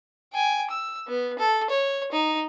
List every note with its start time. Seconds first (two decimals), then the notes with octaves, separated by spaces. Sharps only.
0.33 G5 G#5
0.70 E6
1.07 B3
1.39 A4
1.70 C#5
2.12 D#4